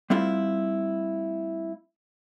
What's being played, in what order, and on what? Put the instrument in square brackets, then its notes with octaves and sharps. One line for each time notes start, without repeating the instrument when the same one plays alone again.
[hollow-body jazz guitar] G3 A3 C4 E4 F4